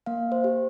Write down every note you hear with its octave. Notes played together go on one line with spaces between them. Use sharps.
A#3 F5
C5
G4